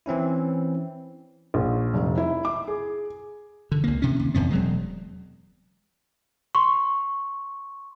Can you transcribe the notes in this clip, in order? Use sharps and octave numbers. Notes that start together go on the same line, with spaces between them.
E3 C4 C#4 E4
A#1
F1
E4
D6
G#4
D3
C#2 A#3
C3 C#4
D#2
F1 E2 C3 B3
E1 F#3 G#3
C6 C#6